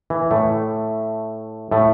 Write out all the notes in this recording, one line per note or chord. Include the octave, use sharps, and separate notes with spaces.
E3
A2 A3
A2 A3